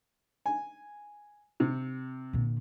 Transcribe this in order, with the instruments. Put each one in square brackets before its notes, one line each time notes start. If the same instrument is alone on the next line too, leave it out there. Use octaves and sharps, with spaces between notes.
[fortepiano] G#5
C3
[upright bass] A#2 D3